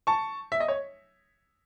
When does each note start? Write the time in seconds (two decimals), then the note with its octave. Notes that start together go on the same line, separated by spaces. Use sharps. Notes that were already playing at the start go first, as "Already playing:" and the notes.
0.07 A5 C#6
0.52 E5
0.60 D#5
0.68 C#5